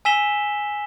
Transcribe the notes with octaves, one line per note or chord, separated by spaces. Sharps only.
G#5 E6 B6 E7 G7